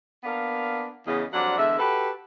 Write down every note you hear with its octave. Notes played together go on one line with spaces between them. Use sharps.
A#3 B3 D4 A#4 F5
E2 C#3 D#5
F2 F#3 G3 D4 C5 F#5
E2 D3 G#3 E5
F#4 G4 A4 B4